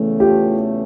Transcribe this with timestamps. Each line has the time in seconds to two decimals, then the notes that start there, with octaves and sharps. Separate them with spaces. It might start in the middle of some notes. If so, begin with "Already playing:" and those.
Already playing: E2 C#3 E3 A3 C#4
0.20 F4 G4